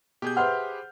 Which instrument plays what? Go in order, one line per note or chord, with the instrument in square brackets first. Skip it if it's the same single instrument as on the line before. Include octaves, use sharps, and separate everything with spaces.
[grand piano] B2 [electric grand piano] G4 G#4 G6
[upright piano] B4 C5 E5 [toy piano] F#5 [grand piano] F6